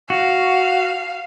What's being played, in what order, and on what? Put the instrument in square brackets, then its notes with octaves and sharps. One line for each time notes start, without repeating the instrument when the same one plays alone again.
[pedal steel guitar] F#4 [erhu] F5